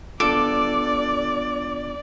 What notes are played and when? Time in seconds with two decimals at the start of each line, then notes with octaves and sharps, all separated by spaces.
0.20 B3 D4 F4 A4 D5 D6